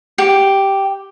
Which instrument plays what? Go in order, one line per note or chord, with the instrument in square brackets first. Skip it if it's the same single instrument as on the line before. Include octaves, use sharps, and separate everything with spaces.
[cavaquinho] G4